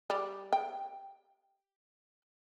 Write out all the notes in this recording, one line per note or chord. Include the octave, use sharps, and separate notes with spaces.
G3
G5